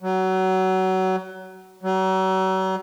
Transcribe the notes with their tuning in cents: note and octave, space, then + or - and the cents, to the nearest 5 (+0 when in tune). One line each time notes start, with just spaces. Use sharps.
F#3 +25
F#3 +40